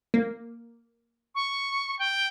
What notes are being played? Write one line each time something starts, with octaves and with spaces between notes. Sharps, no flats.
A#3
C#6
G5